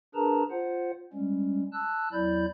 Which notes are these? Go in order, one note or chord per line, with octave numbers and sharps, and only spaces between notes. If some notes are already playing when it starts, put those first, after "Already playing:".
D4 G#4 A#4 B4 A5 A#5
F4 C5 F#5
G3 G#3 C#4
A5 E6 F#6
E2 F#3 E4 D5 B5 G6